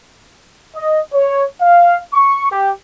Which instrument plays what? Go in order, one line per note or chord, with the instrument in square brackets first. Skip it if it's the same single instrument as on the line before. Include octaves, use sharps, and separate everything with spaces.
[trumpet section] D#5
C#5
F5
C#6
G4